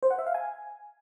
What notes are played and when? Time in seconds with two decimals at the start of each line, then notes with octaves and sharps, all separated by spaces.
0.03 C5
0.11 F#5
0.18 E5
0.26 F5
0.34 G#5